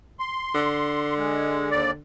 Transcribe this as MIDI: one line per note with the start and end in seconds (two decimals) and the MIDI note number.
0.19 1.13 84
0.54 2.02 50
1.18 1.69 56
1.71 1.91 39
1.71 1.91 74